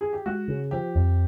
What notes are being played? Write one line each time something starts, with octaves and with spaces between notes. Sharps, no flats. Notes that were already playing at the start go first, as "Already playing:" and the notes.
G#4
G4
G#3 F#4
C#3
F3 G4
F2